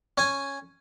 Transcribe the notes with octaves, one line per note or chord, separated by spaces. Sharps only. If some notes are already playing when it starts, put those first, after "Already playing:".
C#4 G#5